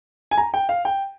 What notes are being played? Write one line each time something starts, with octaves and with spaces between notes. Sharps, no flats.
G#5
A#5
G5
F5
G5